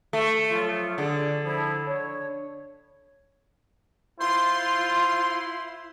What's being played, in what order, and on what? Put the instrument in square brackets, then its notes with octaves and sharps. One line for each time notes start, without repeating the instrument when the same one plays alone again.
[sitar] A3
[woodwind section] F3 F#3 F4
[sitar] D3 [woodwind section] G#4 D5
[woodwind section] F3 E4
C#5
[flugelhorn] E4 [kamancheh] F4 [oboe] C5 [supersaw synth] C6